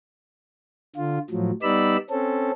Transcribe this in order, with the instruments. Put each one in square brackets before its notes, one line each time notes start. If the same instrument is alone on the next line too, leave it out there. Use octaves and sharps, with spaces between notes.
[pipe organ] D3 F4
A2 F3 F#3
G3 B3 D#4 D5 B5 E6
C4 C#4 A4